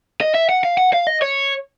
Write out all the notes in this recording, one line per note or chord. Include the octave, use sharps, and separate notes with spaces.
D#5
E5
F#5
F5
F#5
F5
D#5
C#5